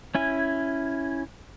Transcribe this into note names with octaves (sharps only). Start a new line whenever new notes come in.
C#4 E4 G#5